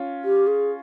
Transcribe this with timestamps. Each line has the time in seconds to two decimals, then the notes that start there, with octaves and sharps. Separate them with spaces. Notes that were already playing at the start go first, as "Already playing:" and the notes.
Already playing: C#4 F4
0.24 G4
0.47 G#4